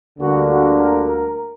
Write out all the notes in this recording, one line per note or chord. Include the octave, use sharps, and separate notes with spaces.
D2 D3 G3 A#3 F#4
F#4
A#4
A#4